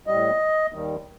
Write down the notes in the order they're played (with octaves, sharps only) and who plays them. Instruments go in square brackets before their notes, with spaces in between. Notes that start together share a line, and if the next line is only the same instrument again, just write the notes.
[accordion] A2 G3 D#5
D#2 D#3 G3